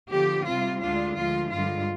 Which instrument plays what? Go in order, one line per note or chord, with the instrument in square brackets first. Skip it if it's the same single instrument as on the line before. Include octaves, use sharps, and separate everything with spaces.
[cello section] D3 F3 B3 G4
C3 G3 C4 F4
D2 D3 G#3 D4 F4
D2 D3 F3 G#3 F4
G2 D3 G#3 F4